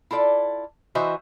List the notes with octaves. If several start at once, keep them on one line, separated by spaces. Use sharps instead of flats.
E4 F4 A4 D5
E3 F#4 C5 D#5 E5